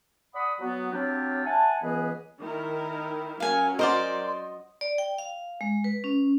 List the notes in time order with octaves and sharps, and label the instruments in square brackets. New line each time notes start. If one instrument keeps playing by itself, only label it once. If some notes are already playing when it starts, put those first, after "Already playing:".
[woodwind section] D5 F#5 B5 D#6
F#3 B3 F#4
F#3 C4 D4 F4 G4 C#5
E5 F#5 G#5 A5
C#2 E3 B3 G#4 B4 D#5
[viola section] D#3 E4 A#4
[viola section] F#3 C#4 [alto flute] A#4 [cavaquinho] F5 G#5
[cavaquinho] A#4 C5 D5 [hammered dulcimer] D#5 F#5 [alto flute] C6
[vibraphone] D5
G5
F5
G#3
B4
C#4